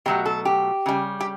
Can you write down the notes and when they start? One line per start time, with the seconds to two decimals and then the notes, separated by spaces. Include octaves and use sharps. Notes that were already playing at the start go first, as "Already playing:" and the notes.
0.06 B2 F#3 A3 G4
0.26 A4
0.45 G4
0.86 C#3 G3
1.20 G4